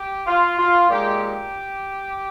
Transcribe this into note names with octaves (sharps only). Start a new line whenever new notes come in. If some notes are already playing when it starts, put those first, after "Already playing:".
Already playing: G4
F4
F4
A#2 G#3 D#4 G4
G4